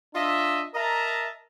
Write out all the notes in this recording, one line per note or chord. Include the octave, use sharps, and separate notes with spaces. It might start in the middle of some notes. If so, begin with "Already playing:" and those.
D4 F4 D#5 E5
A#4 D#5 E5 A5 A#5